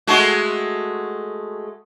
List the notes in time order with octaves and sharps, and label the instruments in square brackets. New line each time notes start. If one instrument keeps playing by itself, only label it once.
[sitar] G#3 A3 F#4